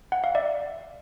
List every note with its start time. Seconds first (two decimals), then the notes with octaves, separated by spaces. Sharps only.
0.12 F#5
0.24 F5
0.35 D5 E5